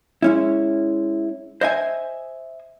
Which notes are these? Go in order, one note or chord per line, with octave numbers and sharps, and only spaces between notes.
G#3 C#4 E4
C5 D#5 E5 G#5